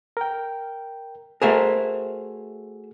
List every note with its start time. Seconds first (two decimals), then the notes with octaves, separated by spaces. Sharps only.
0.17 A#4 G5
1.42 A3 F#4 G#4 A#4 C5 E5